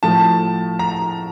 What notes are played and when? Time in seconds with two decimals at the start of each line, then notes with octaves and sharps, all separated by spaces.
0.03 A2 F3 A3 A5
0.79 A#5